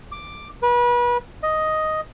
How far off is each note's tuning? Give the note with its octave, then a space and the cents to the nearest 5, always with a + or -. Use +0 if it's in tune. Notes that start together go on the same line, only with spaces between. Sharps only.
D6 +5
B4 -30
D#5 +5